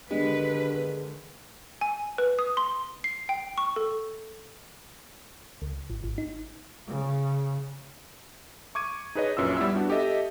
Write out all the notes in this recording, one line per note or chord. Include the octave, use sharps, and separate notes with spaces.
D3 D#3 G#3 B3 D4 G4 B4
G#5
B4
D#6
C6
C7
G5
C#6
A4
C#2
G#1
G#1
D#4
C#3
C#6 D6 G#6 D#7
D#4 G#4 B4 C#5 D#5
A#1 F#2 C#4 F4 B4 E6
G3 B3 E4 E5 E6
B3 D4 F#4 G4
G4 A4 D#5 E5